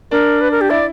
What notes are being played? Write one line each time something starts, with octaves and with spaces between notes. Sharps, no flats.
D4 A#4
B4
A#4
G4
E4 D5